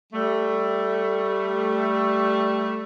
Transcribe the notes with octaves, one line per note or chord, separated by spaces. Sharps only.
G3 A3